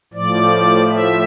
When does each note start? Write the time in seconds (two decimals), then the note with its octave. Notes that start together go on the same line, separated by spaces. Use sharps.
0.13 A2 F3 D5
0.91 E5